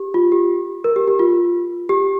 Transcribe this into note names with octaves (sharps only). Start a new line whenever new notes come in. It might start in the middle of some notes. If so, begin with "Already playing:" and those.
Already playing: G4
F4
G4
A#4
G4
G4
F4
G4